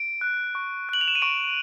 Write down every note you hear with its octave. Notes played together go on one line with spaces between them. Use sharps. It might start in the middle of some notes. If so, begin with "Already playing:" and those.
Already playing: D7
F#6
C#6
F#6 F#7
F7
E7
D#7
C#6 D7